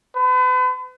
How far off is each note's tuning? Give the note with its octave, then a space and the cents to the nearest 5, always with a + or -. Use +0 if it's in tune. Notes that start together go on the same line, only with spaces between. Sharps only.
B4 +40